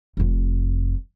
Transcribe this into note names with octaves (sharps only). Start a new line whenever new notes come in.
F1 F2